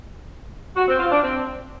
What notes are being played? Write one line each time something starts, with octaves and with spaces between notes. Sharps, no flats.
F#4
C4
F4
D4
C4